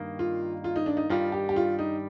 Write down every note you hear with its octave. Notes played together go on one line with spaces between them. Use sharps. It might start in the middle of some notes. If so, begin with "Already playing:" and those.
Already playing: G2 D#3 A#3
F4
F4
D#4
D4
D#4
G2 D#3 G3 F4
G4
G4
F4
D#4